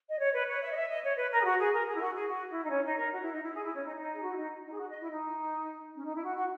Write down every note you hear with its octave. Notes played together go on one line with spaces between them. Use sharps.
D#5
C#5
B4
C#5
E5
D#5
E5
D#5
C#5
B4
A#4
G#4
F#4
G#4
A#4
G#4
E4
F#4
G#4
F#4
E4
D#4
C#4
D#4
A#4
F#4
E4
D#4
E4
G#4
E4
C#4
D#4
D#4
G#4
F#4
E4
D#4
D#4
G#4
F#4
D#5
E4
D#4
C#4
D#4
E4
F#4
F#4